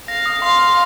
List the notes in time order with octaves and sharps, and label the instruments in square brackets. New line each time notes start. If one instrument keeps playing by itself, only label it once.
[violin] F5 [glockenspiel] A#6
[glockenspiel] D#6
[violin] F5 [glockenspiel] C6
[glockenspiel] C6